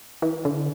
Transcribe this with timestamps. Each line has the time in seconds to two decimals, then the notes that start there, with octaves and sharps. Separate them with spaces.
0.22 E3
0.45 D3